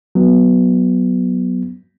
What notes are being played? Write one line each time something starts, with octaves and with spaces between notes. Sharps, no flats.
F#3 B3